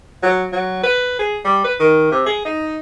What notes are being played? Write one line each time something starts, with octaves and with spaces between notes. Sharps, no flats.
F#3
F#3
B4
G#4
G3
B4
D#3
C3
G#4
D#4